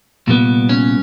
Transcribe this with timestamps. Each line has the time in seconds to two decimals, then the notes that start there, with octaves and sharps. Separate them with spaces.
0.27 C2 A#2 G3 B3
0.69 C#4